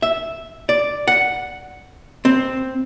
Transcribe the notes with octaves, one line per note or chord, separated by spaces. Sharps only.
E5
D5
F#5
C4